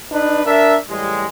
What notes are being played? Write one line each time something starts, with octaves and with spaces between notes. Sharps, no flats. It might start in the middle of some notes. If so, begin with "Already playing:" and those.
D4 D#4 B4
D4 A#4 E5
A1 G3 G#3